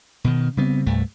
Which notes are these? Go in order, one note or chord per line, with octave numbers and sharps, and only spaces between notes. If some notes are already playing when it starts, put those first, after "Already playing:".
B2 D#3
C#3 G3 B3 C4
C2 G2 A3